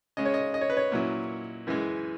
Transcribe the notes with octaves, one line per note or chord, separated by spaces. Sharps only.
C#3 G#3 C#4 D#5
C#5
D#5
D#5
C#5
B4
C#5
A#2 F#3 C#4 E4
F#2 E3 G#3